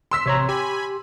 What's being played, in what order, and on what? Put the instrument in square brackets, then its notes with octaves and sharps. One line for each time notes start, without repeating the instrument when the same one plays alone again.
[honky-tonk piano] C6 E6 B6
[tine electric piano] A1 C#5 A#5 [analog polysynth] C3
[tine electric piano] G4 [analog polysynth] G#5 B5